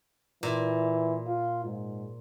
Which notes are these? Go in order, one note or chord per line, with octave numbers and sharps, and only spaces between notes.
A#2 E3
F4
G#2